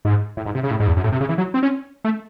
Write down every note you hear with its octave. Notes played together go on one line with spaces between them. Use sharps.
G#2
A2
G#2
C3
C#3
A2
G#2
E2
F#2
A2
C3
C#3
E3
F#3
C4
C#4
A3